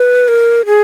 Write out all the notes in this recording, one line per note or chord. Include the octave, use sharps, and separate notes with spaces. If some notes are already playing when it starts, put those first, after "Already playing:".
Already playing: B4
A#4
G#4